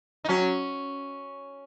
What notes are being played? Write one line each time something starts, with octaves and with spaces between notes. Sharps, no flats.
D#4
F#3 C#4